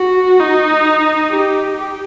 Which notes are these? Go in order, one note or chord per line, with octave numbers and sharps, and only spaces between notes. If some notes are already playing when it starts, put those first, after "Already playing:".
Already playing: F#4
D#4
G4
G4